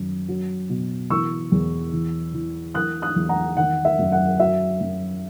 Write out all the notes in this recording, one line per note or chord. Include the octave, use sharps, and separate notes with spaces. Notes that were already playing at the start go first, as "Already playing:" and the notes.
Already playing: F#2 D#3
F#3
B2
E3 C#6 E6
E2
E3
E3
E3 D#6 F#6
D#6 F#6
E2
F#5 A#5
D#3 F#5
E5
F#2
F#5
F#3 E5
F#2